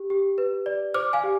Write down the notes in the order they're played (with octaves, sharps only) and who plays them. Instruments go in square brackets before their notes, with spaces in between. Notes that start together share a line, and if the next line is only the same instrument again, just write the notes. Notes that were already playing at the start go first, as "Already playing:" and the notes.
Already playing: [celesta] G4
G4
B4
D5
C5 D6 F6
F5 G#5
G4